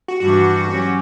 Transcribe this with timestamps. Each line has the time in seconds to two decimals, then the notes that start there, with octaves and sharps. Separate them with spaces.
0.08 F#4
0.20 G2 E3 G3 D4 F#4
0.68 F#3 C#4 G4